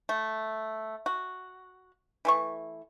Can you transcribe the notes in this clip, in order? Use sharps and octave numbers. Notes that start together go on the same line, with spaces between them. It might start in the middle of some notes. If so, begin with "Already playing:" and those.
A3
F#4
E3 A3 C#6